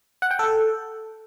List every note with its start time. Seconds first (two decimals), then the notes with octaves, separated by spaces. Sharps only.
0.22 F#5
0.31 G5
0.39 A4